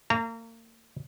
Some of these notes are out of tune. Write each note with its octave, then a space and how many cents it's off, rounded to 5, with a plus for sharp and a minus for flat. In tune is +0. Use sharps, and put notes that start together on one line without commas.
A#3 -35 A#5 -20